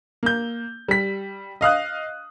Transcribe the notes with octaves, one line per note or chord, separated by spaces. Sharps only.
A#3 G6
G3 B6
D#5 F5 D#6 F#6